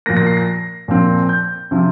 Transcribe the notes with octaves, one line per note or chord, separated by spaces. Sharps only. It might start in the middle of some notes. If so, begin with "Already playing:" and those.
A#2 F3 A#3 A#6
A#6
C7
A#6
A#2 F3 C4
G6
C3 F3 C4